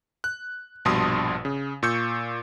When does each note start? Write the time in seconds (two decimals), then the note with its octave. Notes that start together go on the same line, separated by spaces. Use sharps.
0.24 F#6
0.85 A#1 G2 B2 A5 C6 D#6
1.45 C#3
1.83 A#2 C#6 E6 G6 C#7